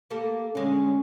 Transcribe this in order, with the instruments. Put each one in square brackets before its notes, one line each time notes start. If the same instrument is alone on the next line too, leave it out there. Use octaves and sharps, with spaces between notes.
[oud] A#3 G4 A4
[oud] D3 G#3 [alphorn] C#4